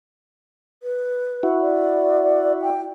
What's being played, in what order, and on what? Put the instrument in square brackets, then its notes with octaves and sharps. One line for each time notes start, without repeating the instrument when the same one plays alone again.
[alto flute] B4
[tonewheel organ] E4 F#4
[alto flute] D5
G5